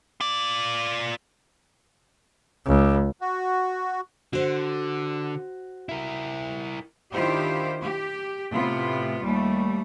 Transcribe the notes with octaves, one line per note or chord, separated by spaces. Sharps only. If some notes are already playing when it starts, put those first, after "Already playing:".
F4 D5
C#2
F#4
D3 F#4 C5
E4 A#4
D#3 D4 E4 F4 G4 C5
G4
A2 C3 B3 F4
D#2 G3 A3